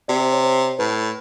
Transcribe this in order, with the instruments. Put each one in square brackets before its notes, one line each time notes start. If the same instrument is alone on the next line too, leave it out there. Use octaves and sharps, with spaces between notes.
[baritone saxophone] C3 [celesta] D5
[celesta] C5
C#5
C5
[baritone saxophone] A2 [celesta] B4